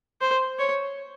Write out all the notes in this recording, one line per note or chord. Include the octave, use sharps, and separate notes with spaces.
C5
C#5